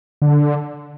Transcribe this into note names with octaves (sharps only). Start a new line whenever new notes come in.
D3